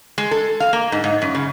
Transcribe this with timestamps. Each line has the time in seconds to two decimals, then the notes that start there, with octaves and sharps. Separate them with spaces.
0.18 G#3
0.31 A4
0.60 F5
0.73 A#3
0.92 G#2
1.04 G#2
1.22 F#2
1.35 C#3